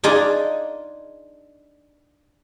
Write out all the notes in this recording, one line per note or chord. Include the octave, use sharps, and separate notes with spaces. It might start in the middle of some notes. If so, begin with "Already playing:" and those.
D4 D#4 F4 G#4 D5 D#5